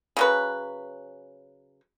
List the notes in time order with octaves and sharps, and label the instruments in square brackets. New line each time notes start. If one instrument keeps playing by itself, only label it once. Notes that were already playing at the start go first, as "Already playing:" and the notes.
[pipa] C#3 F#3 B4